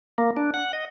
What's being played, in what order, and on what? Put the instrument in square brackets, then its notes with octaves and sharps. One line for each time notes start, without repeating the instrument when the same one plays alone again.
[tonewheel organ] A#3
D4
F#5
D#5